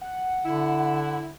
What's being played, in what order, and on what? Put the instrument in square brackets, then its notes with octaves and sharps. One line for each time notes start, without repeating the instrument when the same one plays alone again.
[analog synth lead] F#5
[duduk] D3 [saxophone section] E4